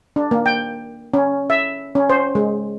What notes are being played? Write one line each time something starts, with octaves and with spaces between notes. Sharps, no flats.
D4
A#3
G5
C#4
E5
C#4
C5
G#3